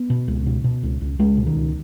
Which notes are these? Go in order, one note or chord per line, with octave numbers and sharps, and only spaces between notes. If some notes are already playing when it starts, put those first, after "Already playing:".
Already playing: B3
B2
C#2
B2
B2
C#2
C#2
C#2 G#3
B2
D#3
C#2